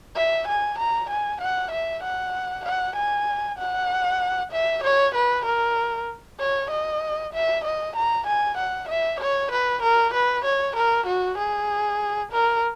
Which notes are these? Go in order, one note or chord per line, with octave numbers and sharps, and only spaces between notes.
E5
G#5
A#5
G#5
F#5
E5
F#5
F#5
G#5
F#5
E5
C#5
B4
A#4
C#5
D#5
E5
D#5
A#5
G#5
F#5
E5
C#5
B4
A#4
B4
C#5
A#4
F#4
G#4
A#4